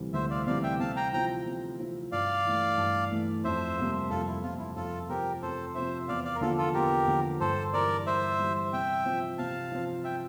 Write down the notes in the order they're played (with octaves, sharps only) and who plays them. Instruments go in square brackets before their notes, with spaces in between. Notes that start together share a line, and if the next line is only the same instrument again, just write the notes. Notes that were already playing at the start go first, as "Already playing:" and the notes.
Already playing: [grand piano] D2 C3 E3 G3
[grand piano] D2 [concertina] C5 E5
[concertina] D5 F5
[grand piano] C3 E3 G3 [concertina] D5 F5
[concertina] E5 G5
[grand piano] C3 [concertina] F5 A5
[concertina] G5 A#5
[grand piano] F3 C4 E4 [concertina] G5 A#5
[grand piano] C3
F3 C4 E4
[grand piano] G2 [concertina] D5 F5
[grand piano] E3 A3
G2
E3 A3
[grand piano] F2 [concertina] C5 E5
[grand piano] C3 G3 A#3
[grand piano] F2 [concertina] F4 A4
[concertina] E4
[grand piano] C3 G3 A#3 [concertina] F4
[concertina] E4
[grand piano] F2 [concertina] F4 A4
[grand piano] C3 F3 C4 [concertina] G4 A#4
[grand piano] F2 [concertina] A4 C5
[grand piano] C3 F3 C4 [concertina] C5 E5
[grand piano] E2 [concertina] D5 F5
[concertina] D5 F5
A#4
[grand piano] D3 F3 A#3 [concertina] F4 A4
[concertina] F4 A4
[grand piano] E2 [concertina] G4 A#4
[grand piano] D3 F3 A#3
[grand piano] G2 [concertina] A4 C5
[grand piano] E3 G3 [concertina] A#4 D5
[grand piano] G2 [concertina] C5 E5
[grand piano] E3 G3
[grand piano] C3 [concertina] E5 G5
[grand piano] F3 C4
[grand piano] C3 [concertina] F5 A5
[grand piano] F3 C4
[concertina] E5 G5